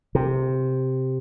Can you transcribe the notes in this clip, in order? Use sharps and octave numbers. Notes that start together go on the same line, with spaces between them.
C3